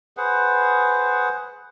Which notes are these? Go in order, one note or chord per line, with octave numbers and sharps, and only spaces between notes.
G#4 B4 C5 F#5